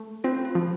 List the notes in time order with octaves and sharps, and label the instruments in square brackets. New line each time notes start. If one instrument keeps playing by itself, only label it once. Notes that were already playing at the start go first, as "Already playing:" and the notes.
Already playing: [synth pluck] A3
[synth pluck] C4 [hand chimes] F4
[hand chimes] F4
[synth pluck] F3